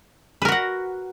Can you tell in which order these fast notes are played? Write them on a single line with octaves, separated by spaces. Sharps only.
B4 A#4 F#4 F#5